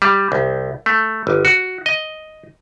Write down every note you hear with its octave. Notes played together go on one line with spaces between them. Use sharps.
G3
C2
A3
G1
F#4
D#5